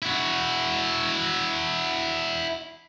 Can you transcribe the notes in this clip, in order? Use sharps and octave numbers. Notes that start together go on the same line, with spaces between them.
E4 F#4